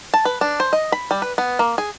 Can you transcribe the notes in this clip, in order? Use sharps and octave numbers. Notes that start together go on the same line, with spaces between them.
A5
B4
D4
C5
D#5
B5
G3
B4
B3
A#3
G#4